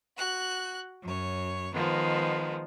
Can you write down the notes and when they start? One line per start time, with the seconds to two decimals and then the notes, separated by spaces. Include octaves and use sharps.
0.16 F#4 F#6
1.03 F#2 C#5
1.74 D#3 F3 G#3 B3